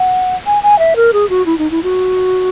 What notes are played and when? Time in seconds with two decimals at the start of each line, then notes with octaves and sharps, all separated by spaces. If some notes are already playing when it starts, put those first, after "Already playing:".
Already playing: F#5
0.46 G#5
0.63 G#5
0.79 E5
0.96 A#4
1.13 G#4
1.30 F#4
1.46 E4
1.58 D#4
1.71 E4
1.83 F#4